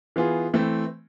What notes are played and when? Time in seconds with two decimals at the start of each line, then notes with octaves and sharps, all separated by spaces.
0.16 E3 B3 F4 G#4
0.54 E3 A3 C4